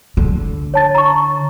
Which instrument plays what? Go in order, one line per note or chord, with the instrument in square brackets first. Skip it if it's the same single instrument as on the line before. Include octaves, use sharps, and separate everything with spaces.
[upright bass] D3
[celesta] C#5 A5 A6
A#5 C#6